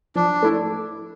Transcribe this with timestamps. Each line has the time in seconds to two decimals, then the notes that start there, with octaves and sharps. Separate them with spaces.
0.15 F3 D4
0.42 A3 E4